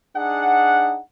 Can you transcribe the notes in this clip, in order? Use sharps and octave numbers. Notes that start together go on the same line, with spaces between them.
D4 D#4 G#4 F#5